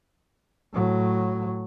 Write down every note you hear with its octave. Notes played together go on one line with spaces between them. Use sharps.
A2 F#3